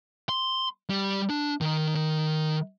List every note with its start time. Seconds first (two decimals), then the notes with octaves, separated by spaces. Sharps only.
0.29 C6
0.90 G3
1.30 D4
1.61 D#3
1.95 D#3